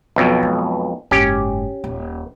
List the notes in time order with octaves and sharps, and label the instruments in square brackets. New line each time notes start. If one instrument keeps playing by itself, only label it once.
[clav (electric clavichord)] B1 F2 B2
[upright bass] G#3
[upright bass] F#1 G#2 [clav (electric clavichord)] C#4 G4
[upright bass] D#1